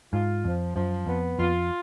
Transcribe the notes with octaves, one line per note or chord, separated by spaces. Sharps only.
G#2 F4
F2 F3
F#2 F3
F2 B3
F2 F4